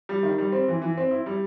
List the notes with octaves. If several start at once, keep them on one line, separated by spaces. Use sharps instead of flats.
G3
D#3
G3
C4
E3
E3
C4
E4
G3